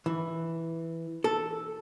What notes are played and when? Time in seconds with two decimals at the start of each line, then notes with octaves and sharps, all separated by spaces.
0.06 E3
1.24 A4